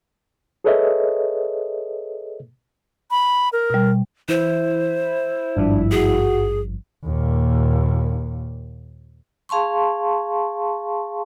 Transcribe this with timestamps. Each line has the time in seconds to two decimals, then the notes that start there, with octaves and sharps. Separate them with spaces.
0.64 G#4 A4 B4 C#5 D#5 E5
3.11 B5
3.53 A#4
3.70 B2 G3
4.29 E3 E4 C5
5.57 G#1 G2 F3 D4
5.92 F#4 G#4
7.05 D#2 A#2
9.49 G#4 F5 A5 C6 C#6